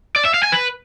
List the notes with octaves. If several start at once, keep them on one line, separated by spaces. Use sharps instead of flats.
D5
E5
F5
G#5
B4